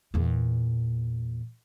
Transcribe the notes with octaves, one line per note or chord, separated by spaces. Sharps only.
E2 A#2